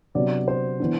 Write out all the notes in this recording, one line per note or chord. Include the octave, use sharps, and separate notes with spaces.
C3 F#3 B3 D4 D5
C5
E3 B3 D4